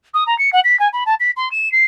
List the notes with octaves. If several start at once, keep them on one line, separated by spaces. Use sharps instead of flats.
D#6
A#5
C#7
F#5
B6
G#5
B5
A5
B6
C6
E7
C7